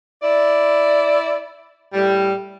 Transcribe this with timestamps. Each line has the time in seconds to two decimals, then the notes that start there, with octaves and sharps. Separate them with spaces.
0.21 E4 D5
1.93 A2 G3